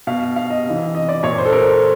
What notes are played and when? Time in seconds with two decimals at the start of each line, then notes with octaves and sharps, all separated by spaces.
0.07 B2 F5
0.36 F5
0.50 D#5
0.65 C3 E3
0.95 D#5
1.09 D5
1.23 A#2 C#5
1.38 C5
1.45 A4
1.53 A#4